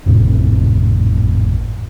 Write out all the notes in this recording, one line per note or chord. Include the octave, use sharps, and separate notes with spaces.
G#1 F2 A2 C3